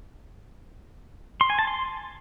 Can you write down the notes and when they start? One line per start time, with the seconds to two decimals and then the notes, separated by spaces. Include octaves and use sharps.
1.41 C6
1.50 G#5
1.59 A5
1.67 C6